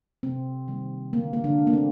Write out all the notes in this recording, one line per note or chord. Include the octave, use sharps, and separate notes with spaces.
C3 C4
D#3 G3 A#3
D3 A#3
A#3
D3 D4
A3
A#3
C4